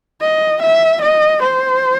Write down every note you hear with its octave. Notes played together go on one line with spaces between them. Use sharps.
D#5
E5
D#5
C5